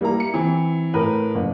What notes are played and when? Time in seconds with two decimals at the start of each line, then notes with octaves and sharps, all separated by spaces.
0.01 G3 A#3 E4 A#5
0.20 C#7
0.34 E3 C4
0.94 A2 A#4 B4
1.35 F#1